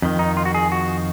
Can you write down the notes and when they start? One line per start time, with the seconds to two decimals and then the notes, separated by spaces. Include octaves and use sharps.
0.02 F2 D#3
0.19 D#4
0.37 F4
0.45 F#4
0.54 G#4
0.72 F#4